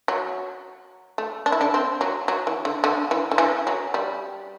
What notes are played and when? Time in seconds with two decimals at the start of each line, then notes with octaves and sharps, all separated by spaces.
0.08 F#3
1.18 A3
1.46 D4
1.52 E4
1.61 D3 D4
1.74 C4
2.01 F#3
2.28 F#3
2.47 E3
2.65 D3
2.84 D3
3.11 E3
3.31 D3
3.38 E3
3.67 F#3
3.94 G3